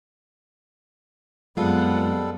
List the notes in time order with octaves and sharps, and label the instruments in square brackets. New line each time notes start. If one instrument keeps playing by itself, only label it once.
[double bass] F#2 [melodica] G3 A4 [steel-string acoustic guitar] G#3 F4 [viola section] B3 C4 F#5